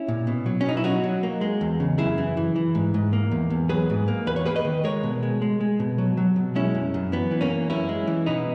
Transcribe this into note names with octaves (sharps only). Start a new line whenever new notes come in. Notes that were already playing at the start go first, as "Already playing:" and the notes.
Already playing: C#4 E4
A#2
B2
F#3
C#4
B2 D#4
E4
F#3 D#4 F#4
F#3
A#3
G#3
E2
C#3
F#2 E4 G#4
E3
E3
E3
G#2
G#2
A#3
E2
E2
F#3 G#4 B4
G#2
A#3
E2 B4
C#5
A#3 G#4 B4
B4 D#5
D#3
G#3 A#4 C#5
B2
G#3
G#3
G#3
B2
F#3
F#3
B2
G#3 C#4 E4
F#2
F#2
E3 B3
E3
A#3 C#4
E3
F#2 C#4 E4
G#3
E3
B2 B3 D#4